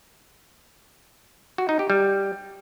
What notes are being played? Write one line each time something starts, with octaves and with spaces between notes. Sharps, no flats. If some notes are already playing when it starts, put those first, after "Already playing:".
F#4
D#4
G4
G3